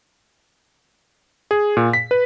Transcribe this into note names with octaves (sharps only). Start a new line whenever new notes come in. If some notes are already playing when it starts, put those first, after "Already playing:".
G#4
A#2
B6
B4